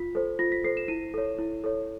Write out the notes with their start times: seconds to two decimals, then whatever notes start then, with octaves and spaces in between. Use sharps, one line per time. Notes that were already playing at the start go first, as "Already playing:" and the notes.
Already playing: F4 B6
0.15 A4 C5
0.39 F4 A#6
0.52 B6
0.64 A4 C5 C7
0.77 E7
0.88 E4 D#7
1.14 A4 C#5
1.38 E4
1.64 A4 C#5